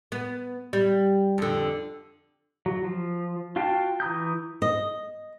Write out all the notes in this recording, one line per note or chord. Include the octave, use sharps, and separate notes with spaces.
B3
G3
F2 D3
F#3
F3
F4 F#4 F5 G5 A5
E3 A#5 D#6 G6
D#5